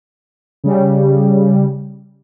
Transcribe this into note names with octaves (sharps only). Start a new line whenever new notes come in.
C#3 G3